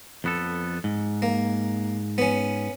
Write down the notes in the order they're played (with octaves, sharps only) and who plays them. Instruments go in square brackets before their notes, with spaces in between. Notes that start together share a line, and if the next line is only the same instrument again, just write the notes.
[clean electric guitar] F2 B3 A4
G#2
[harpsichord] A#3
B3 C#4